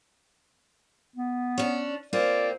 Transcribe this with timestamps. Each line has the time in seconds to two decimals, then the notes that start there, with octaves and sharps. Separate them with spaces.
1.16 B3
1.58 C#4 D4
2.13 A#3 C4 F4 D5